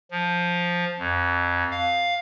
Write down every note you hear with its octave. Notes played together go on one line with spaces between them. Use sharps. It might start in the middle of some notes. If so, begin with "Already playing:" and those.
F3
F2
F5